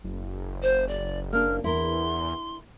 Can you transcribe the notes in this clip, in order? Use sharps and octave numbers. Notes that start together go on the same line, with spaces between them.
F#1
C5
D5
A#3 D4 F6
E2 E4 A#4 C6